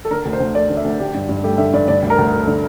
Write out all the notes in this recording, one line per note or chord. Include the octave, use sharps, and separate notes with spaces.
A4
D3 A#4
D2
C5
D2
A3 D5
D3
E5
D2
D3 G4
G2
G2
A3 G4
D3 E5
G2 D5
D3 D5
D2
A#4
D2
A3
D3